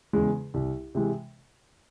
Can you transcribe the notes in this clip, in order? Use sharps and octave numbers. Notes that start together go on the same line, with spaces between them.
E2 C#3 G#3
C2
C3 E3 G#3